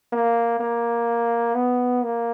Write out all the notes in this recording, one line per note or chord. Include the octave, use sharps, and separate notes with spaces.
A#3
A#3
B3
A#3